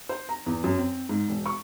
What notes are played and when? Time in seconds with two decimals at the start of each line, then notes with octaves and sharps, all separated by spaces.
0.09 C5
0.29 A#5
0.46 E2
0.64 F#2
0.78 C4
1.09 G#2
1.29 E1
1.46 C#6